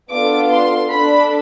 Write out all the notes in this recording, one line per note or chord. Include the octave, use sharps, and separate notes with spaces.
B3 D4 F4 A4 D6
C6
D4 A4 B5